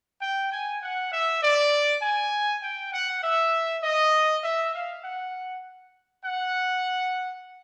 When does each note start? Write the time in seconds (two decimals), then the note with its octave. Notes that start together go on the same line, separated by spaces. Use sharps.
0.21 G5
0.51 G#5
0.81 F#5
1.11 E5
1.41 D5
2.01 G#5
2.62 G5
2.92 F#5
3.22 E5
3.82 D#5
4.42 E5
4.73 F5
5.03 F#5
6.23 F#5